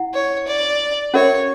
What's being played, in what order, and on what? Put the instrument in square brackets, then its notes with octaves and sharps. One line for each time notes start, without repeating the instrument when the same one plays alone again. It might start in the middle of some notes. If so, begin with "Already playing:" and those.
Already playing: [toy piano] E4 F#5
[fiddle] C#5
D5
[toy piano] C#4 F#4 A#4 E5 [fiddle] C#5